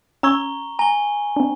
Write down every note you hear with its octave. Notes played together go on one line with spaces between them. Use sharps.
C#4 A#5 C#6 E6 G#6 G7
G#5 A#5 G7
C4 D4